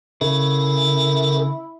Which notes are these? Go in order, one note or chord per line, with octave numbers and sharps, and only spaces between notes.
C#3 E4 A4 A#4